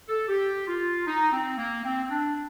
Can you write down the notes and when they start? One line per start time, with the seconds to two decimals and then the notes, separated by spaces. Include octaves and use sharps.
0.08 A4
0.28 G4
0.67 F4
1.07 D#4
1.32 C4
1.58 A#3
1.84 C4
2.04 C4
2.10 D4